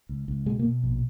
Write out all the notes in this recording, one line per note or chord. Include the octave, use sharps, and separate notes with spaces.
C#2
C#2
B2 G#3
A#3
B2
A#1